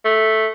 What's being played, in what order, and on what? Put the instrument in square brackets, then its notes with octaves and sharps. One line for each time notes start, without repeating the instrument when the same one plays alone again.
[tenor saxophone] A3